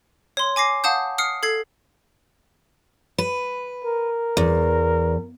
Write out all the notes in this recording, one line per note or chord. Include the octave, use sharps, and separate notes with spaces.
C#5 C6
G#5 D6 A#6 C7
F5 F#5 A5 D#6 G6
D#6 F6 C7 C#7
A4 G#6 C7
B4
A#4
E2